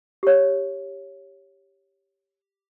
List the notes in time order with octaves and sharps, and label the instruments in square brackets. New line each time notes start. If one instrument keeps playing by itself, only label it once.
[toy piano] G4 C#5